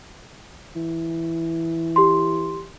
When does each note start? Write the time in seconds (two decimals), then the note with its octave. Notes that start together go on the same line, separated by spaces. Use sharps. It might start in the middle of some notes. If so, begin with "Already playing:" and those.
0.75 E3
1.96 G4 C6